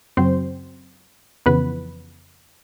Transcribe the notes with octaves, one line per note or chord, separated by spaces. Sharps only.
F#2 C#3 F#3 C4 C5
F2 C#3 E3 B3 B4